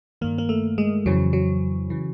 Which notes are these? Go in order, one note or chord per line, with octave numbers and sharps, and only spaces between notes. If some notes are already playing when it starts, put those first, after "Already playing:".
G2 D#3 A#3
A#3
A3
G#3
F2 C#3 E3 F#3
F#3
C#3 E3